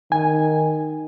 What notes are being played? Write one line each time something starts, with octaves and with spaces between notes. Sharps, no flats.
D#3 G#5